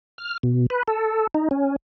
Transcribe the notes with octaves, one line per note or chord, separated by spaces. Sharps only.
F6
B2
B4
A4
D#4
C#4